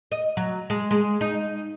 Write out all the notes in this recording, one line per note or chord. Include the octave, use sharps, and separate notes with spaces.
D#5
F#3
G#3
G#3
D#4